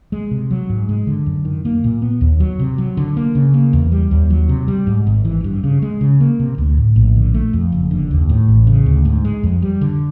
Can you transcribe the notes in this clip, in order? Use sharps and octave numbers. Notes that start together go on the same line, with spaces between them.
G#3
C3
F#3
G#2
G#3
D3
F#2
D#3
A#3
A#2
B3
D#2
F#3
C3
F#3
D3
A#3
C#3
A#3
E2
G3
D#2
F#3
C3
G3
G#2
G#1
E3
G2
C#3
G#3
C#3
A#3
C3
D2
A2
A#1
D3
A3
F2
F#1
D3
D#2
A2
A1
C#3
D2
G#2
G#3
F2
G3
D3